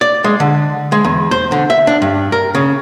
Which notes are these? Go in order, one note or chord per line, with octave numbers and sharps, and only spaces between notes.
D5
G#3
D3
G#3
E2
C5
D3
E5
D4
G2
A#4
C#3